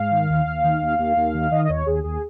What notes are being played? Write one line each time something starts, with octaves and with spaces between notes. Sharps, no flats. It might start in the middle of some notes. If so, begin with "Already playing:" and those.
Already playing: G#2 F5
D#3
D#2
D#2
D#3
D#2
D#2
D#2
D#3
D#3 D#5
D#5
D#2 C#5
D#2 G#4
D#2 G#4